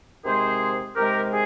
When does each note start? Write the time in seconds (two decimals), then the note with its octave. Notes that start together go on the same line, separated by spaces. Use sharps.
0.24 C3 D#3 G#3 G#4 C5
0.95 C3 D#3 G#3 G4 A#4
1.30 G#4